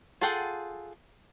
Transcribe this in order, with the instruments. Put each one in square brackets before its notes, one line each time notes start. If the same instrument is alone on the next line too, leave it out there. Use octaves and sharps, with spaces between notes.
[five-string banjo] F4 G#4 A4 F#5 G5